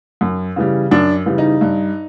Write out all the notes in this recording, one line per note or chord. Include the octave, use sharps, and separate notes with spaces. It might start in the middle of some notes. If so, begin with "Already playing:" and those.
F#2
C#3 E3 G3
F#2 D4
C#3 E3 G3
D#4
G2